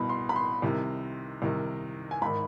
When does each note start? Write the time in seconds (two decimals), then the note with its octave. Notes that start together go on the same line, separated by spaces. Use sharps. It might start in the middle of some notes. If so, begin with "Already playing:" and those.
Already playing: C2 B2 B5
0.09 C6
0.29 B5
0.36 C6
0.62 C2 C3 D#3
1.42 C2 C3 D#3
2.11 G#5
2.22 G#1 D#3 B5